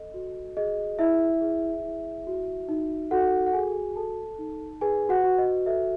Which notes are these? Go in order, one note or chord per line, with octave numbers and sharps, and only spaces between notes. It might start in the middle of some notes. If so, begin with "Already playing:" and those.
Already playing: A4 D#5
F#4
G#4 D#5
E4 E5
G#4
E4
F#4
D#4
F#4 A4 F#5
F#5
F#4 G#4 G#5
A4 A5
D#4
G#4 B4 G#5
F#4 F#5
F#4
D#5
A4 E5